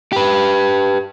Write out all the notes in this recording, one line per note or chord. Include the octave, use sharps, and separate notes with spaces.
G4 B4